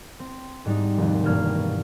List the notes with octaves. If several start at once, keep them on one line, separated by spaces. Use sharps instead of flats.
C4
G#2 G3 C4 D#4
F1 D#2
E1 G2 B2 A#3 F6 G#6
B2